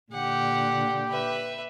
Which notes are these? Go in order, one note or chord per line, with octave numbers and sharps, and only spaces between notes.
A#2 D3 G4 F#5
B4 E5